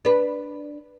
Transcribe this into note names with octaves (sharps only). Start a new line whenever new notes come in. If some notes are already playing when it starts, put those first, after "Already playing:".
D4 B4